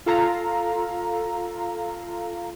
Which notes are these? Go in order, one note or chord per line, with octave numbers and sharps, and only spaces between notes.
F4 A4 F5 A#5